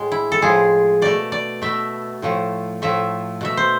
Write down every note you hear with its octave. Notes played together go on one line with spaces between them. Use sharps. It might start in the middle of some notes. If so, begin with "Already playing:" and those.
Already playing: A2 G#3
E4
A4
A2 F3 G#3 G#4
B2 A3 D5
D5
B2 A3 E5
A2 F3 A3
A2 F3 A3 E5
B2 A3 E5
C5